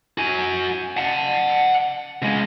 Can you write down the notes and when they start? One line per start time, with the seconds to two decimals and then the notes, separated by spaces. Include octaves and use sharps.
0.18 F#4 G#5
0.97 F#5 A5
2.22 C#2 G#3